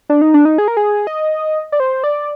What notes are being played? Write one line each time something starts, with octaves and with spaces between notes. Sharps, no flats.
D4
D#4
D4
D#4
G#4
A#4
G#4
D#5
D5
C5
D5